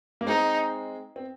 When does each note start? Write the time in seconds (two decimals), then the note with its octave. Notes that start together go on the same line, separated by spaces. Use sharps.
0.21 A#3
0.26 G#3 C4 D#4
1.16 C4